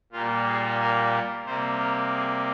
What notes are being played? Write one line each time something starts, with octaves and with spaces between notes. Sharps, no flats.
A#2 G3 A#3 F4
G#4
A#4
C3 G3 A#3 C5
A#4
G#4